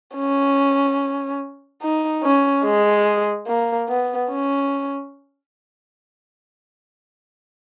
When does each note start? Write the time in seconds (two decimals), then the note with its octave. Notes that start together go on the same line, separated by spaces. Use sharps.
0.16 C#4
1.82 D#4
2.23 C#4
2.64 G#3
3.47 A#3
3.88 B3
4.30 C#4